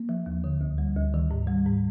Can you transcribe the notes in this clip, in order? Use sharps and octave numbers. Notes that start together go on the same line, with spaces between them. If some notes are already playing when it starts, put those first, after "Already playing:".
Already playing: A#3
F3
D#2
D3
D2
G3
D2
D#3
G#2
G3
G#2